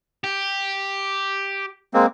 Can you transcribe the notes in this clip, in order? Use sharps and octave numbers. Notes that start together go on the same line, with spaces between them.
G4
G#3 A#3 C4